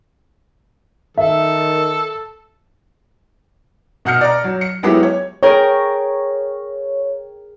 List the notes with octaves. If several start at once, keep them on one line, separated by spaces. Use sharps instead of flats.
D#3 A4 A#4 E5
B2 F#5 F6 G6 C#7
D5 A#5
F#3
C#7
F#3 G#3 B3 E4 G4
C#5
G#4 A#4 C#5 G5